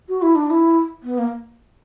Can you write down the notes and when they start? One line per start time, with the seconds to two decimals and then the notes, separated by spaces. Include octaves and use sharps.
0.09 F#4
0.22 E4
0.35 D4
0.50 E4
1.03 B3
1.18 A#3